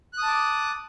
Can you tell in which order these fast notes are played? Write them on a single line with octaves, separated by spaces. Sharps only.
F#6 D#6 A5 D6